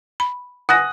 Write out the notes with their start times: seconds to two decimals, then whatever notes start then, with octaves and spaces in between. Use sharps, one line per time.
0.20 B5
0.69 F#5 G#5 D#6 F#6 A#6